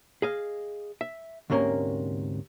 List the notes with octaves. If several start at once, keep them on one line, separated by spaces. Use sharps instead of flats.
G#4 D#5 F5
E5
D2 G#2 C3 A#3 C#4 A#4